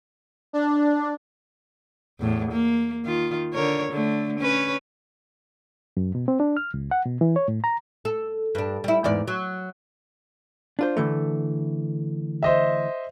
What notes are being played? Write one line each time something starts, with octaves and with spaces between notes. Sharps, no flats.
D4
E2 A2
A#3
D#3 F4
D3 A#4 C#5
D3 A3
C#4 B4 C#5
F#2
B2
C4
D4
F6
C#2
F#5
B2
E3
C#5
A2
A#5
A4
G2 D4
G3 E4
E2 G#2 D5
F#3
D4 F4 C5
D3 E3 A3
C5 D#5 E5